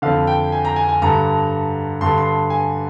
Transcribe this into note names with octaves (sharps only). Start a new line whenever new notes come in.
F2 D3 F5
G5
G#5
A#5
G#5
G#5
G2 D3 A#5
G2 D3 C6
C6
G#5